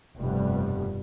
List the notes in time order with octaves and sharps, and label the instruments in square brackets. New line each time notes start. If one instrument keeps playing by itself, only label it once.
[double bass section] F1 G2 B2 G3